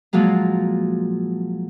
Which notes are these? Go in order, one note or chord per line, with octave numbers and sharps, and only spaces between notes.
A#2 F3 F#3 G#3 A#3